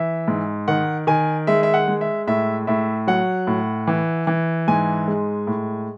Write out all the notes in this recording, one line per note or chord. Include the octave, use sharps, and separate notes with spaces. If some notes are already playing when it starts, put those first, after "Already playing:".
Already playing: E3 E5
G#2
D#3 F#5
D#3 G#5
G#3 E5
E5
F#5
G#3
E5
A2 E5
A2 E5
F#3 F#5
A2
E3
E3
G#2 G#5
G#3
A2